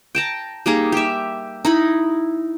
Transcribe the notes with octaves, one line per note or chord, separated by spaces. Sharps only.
G5 A5 A#5
G3 A#3 D#4 G#4
G4 E5
D#4 E4 B5